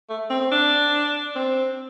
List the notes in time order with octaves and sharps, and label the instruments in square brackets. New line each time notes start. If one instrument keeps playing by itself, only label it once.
[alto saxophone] A3
C4
C4
D4
C4